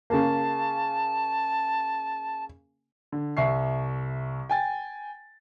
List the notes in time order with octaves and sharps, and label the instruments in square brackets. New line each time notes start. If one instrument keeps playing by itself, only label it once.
[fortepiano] C#3 A#3 [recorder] A5
[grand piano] D3
C2 E5 C#6 C7
G5 G#5 A6